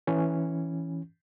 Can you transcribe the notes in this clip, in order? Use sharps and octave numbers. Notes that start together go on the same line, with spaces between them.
E3 C#4